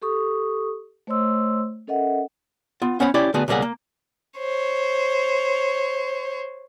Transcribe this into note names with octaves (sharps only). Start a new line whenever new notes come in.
G4 A4 C#6 D#6
A3 C5 C#5 D#5 C6 E6
C#4 A4 A#4 D#5 E5 F#5
B3 F4
B3 C#4 C5 C#5 F#5 B5
C#4 E4 G4 D5
D3 A3 B3 F#4 G#4
C#2 B2 G3 A#3 G#4 F#5
A#3
C5 C#5